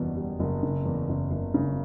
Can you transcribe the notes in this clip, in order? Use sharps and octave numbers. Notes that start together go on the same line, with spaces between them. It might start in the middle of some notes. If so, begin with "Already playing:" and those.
Already playing: F#1 E2 B2 G3
G3
F#1
C#3
E2
F#1
F#1
C#3